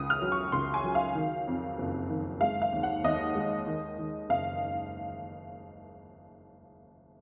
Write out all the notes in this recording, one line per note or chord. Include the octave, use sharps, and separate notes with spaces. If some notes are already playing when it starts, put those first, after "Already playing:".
Already playing: C#2 D#6
F6
F#3
C#6
C#2 C6
G#5
F#3
F5
D#3
F2
F#1
D#3
G#3 F5
F5
D#2
F#5
D#2 D#5
G#3
D#3
D#3
F#1 F5